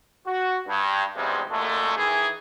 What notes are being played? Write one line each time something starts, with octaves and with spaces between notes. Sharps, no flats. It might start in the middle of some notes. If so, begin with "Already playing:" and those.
F#4
G2
G#1 E2 G2 C3 G3 G#3
F#2 A#2 G#3 A3
D#3 E3 E4 G#4